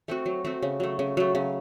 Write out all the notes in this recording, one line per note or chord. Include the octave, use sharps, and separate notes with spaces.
A3 C4 F#4
F#3
A3 C4 F#4
C#3
F#3 A3
C#3
F#3 A3
C#3